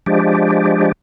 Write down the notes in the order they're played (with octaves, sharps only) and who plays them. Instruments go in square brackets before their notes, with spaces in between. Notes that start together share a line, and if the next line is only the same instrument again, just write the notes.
[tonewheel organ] F3 G#3 D4 G4